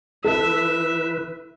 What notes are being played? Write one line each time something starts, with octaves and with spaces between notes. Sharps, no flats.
E3 A4 B4 E5